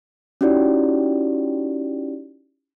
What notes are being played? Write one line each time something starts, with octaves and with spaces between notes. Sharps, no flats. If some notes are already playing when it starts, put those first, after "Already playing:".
C#4 D#4 E4 F#4 G4 D5